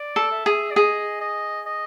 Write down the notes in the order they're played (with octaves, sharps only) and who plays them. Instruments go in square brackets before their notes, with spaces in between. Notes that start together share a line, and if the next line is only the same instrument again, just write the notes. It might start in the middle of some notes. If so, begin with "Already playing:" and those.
Already playing: [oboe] D5
[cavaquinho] A4
[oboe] E5
[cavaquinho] G#4
[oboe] D5
[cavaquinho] G#4 [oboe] D#5
[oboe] D#5
D#5